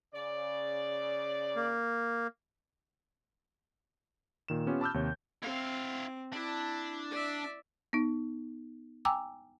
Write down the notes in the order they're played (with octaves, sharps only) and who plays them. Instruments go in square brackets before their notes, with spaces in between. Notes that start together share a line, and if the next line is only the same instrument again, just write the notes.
[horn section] C#3 D5
[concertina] A#3
[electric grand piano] A#2 D#3 E7
B3 C#4 F4 G4
A5 B5 D6 E6 F6 G6
D#2 C3 C#5
[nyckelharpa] C4 [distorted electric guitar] E4 F5
[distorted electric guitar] D4 [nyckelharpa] E4
[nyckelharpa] D5 E5
[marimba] B3 D#4
G5 G#5 A#5 D6 E6